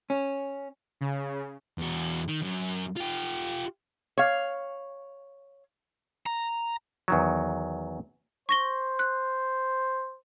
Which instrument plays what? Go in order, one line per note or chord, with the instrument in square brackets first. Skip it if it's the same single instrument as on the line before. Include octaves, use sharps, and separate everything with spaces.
[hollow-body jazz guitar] C#4
[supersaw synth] C#3
[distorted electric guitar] E2 F#4
D#3
F#2
F4 G4
[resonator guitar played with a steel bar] C#5 F5
[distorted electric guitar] A#5
[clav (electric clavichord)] E2 D#3 F#3
[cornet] C5 [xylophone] C#6 A#6 G7
[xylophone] F#6